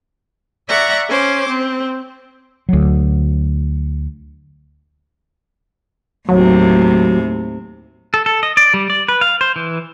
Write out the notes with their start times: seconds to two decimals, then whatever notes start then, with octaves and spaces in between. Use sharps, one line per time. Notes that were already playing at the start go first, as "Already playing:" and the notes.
0.68 D5 E5 F#5 A#5 C#6
1.08 C#4 C5 D6
1.49 C4
2.69 D2 F#3
6.29 D#2 A2 C3 F#3
8.14 A4
8.26 A4
8.43 D#5
8.57 D5
8.74 G3
8.90 D5
9.08 B4
9.21 F5
9.41 C5
9.56 E3